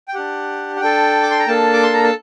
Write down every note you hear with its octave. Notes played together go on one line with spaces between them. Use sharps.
G5
D4 G4 F#5
F#5
D4 A4 G5
D6
C6
A#5
A#3 D4 A4 A5
D6
C6
A#5
A5